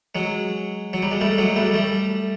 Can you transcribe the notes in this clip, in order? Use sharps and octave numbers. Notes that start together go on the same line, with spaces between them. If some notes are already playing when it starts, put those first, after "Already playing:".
F#3 G#3
F#3
G3
G#3
G3 A3
F#3 G#3
G3 A3
G3 A3